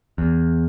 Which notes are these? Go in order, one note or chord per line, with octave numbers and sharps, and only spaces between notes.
E2